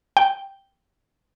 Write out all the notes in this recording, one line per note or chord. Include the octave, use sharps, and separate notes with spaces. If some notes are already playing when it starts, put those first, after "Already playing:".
G5